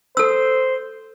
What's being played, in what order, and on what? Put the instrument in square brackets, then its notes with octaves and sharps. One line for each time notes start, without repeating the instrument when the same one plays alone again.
[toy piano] A4 E6 [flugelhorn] C5